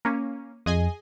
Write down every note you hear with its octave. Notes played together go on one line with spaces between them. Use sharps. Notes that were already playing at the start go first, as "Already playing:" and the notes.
A#3 C#4
F2 G#4 D#5 G#5